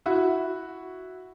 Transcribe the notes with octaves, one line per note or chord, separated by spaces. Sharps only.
E4 F#4